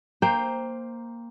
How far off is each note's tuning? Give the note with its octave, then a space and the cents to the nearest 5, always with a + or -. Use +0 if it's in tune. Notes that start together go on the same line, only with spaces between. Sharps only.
A#3 +0 C5 +0 G5 +20